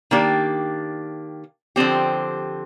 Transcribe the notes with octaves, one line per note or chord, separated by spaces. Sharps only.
D#3 A#3 D4 G4
D3 F3 C4 G4